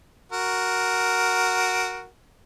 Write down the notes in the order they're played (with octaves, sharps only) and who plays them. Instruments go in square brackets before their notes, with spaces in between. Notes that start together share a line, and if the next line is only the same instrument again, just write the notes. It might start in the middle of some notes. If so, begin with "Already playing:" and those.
[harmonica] F#4 A#4